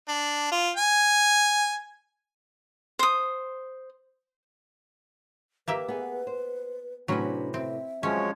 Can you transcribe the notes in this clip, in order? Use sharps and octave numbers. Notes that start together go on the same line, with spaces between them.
D4
F4
G#5
C5 D#6
A#3 G4 B4 E5
B3 G#4
C5
A2 C3 F#3 C#4 D4 B4
C4 E5
F2 F3 F#3 G#3 C#4 C#5